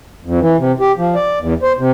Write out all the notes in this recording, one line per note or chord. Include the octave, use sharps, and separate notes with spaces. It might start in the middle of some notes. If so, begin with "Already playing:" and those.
F2
E3
C3
G4
F3
D5
E2
C5
C3